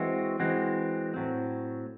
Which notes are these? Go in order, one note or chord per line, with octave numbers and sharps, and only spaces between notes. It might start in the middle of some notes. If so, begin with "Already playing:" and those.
Already playing: E3 G#3 C4 F#4
E3 G#3 C4 F#4
A2 F#3 C4